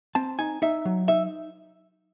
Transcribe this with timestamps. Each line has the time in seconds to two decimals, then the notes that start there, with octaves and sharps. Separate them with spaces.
0.15 C4 A5
0.39 D#4 G#5
0.62 D#4 E5
0.85 F#3
1.08 D#4 E5